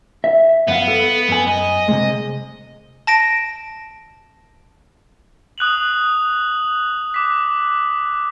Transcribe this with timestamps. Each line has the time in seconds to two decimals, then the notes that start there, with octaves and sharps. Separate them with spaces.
0.24 E5
0.68 F#2 B3 F5
0.88 A4
1.29 F#2 G#5
1.48 D#5
1.88 C3 G#3
3.07 A5 A#6 D7
5.58 D#6 F#6 F7 F#7
7.14 D6 B6